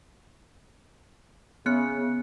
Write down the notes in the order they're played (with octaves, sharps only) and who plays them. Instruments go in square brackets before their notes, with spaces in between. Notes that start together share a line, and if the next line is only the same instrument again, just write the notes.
[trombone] C#3 [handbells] B3 F#6 C#7